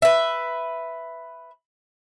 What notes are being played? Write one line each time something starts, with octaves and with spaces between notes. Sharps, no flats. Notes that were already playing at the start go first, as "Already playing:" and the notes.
B4 E5